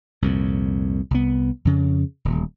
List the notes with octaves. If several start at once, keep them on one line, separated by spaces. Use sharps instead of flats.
C2 F2 A#2
C2 B3
F2 C#3
D#1 D2